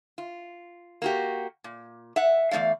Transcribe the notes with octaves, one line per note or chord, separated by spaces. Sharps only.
F4
A#3 F#4 G4
A#2
E5 F#5
E2 G2 A3 D5 F5